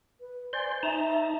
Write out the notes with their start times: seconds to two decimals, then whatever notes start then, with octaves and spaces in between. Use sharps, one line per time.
0.20 B4
0.53 C5 D5 G#5 C6
0.83 D#4 E5 A5 A#5